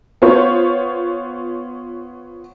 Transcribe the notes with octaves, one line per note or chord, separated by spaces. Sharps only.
B3 F4 C5 C#5